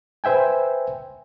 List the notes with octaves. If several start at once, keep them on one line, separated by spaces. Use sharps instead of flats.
B4 C5 E5 G5 G#5